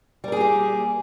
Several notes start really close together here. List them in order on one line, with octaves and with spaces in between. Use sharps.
G3 A#4 G#4 A#3 G4